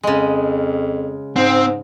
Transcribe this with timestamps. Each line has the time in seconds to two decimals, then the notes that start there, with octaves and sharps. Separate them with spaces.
0.03 F2 C#3 G#3
1.36 G#2 C4